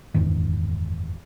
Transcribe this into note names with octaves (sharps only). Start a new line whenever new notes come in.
F#1 E2 G#2 D#3